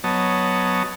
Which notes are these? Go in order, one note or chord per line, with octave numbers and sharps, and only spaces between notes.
F#3 B3 C#5 D#5 A5